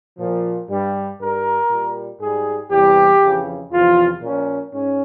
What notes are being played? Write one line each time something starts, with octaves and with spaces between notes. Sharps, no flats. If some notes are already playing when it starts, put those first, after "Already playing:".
A#2 F3
G2 G3
G2 G3 A#4
A#2 G3
G#2 G3 G#4
E2 C3 E3 G3 G4
F2 C#3 E3
E2 C3 F3 F4
A#2 F3 C#4
G#2 C#4